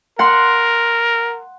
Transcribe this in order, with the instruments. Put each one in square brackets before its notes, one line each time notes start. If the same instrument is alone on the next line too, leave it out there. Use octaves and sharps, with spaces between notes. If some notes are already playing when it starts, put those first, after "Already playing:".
[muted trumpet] A#4 [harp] F#5 C6